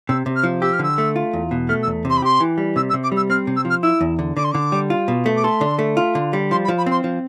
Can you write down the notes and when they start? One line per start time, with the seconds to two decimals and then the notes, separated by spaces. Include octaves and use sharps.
0.09 C3 E6
0.26 C3
0.35 F6
0.44 F3
0.61 G4 E6
0.73 F6
0.79 D3 E6
0.98 A3
1.16 F4
1.33 E2
1.51 B2
1.68 A3 F6
1.82 E6
1.87 E2
2.05 C3 C6
2.17 B5
2.22 G4 C6
2.40 E3
2.58 G3
2.76 C3 E6
2.89 E6
2.94 C3
3.03 D6
3.12 G3 E6
3.30 C4 F6
3.47 C3
3.56 E6
3.65 F3 F6
3.83 E4 E6
4.01 E2
4.19 D3
4.36 D3 D6
4.44 C6
4.51 D3 D6
4.72 G3
4.90 F4
5.08 B2
5.26 A3
5.36 D6
5.44 A4 C6
5.61 D3
5.79 A3
5.97 F4
6.15 D3
6.33 G3
6.51 F3 C6
6.64 B5
6.68 F3
6.77 B5
6.86 C4 C6
7.04 F3